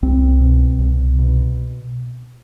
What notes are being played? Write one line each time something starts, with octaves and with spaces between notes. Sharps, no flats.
C2 C4
B2
C2
B2